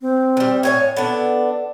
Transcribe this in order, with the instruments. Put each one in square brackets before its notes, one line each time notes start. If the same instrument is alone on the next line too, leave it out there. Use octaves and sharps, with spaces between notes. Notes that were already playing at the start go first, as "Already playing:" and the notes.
[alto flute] C4
[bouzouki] D3 G3
A2 C#5 G#5
[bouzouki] B3 D4 [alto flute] A4